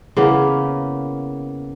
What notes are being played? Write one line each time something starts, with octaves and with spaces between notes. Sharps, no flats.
C#3 E3 A#3 B3